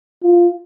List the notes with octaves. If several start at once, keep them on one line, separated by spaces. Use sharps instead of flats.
F4